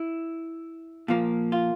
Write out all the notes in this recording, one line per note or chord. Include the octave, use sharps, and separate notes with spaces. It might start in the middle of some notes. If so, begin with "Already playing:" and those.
Already playing: E4
A#2 F3 A#3
F4